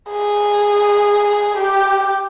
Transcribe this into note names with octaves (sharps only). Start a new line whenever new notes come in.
G#4
G4